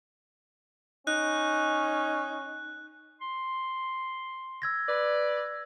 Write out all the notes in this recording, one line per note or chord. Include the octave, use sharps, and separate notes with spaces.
C#4 D#4 F#6
C6
E6 G#6 A#6
B4 D5